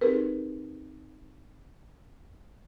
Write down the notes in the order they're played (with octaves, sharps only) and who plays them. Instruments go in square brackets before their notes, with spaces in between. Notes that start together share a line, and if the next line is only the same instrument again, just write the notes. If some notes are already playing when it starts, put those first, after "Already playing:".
[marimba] C4 D#4 G4 G#4 A#4 B4